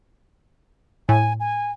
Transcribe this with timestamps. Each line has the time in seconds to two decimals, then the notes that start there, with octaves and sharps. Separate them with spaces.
1.09 A2 G#5
1.40 G#5